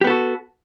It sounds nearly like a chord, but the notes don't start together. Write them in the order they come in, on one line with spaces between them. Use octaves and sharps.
G4 B3 A4 F#4